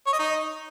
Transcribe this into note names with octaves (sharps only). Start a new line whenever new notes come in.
C#5
D#5
D#4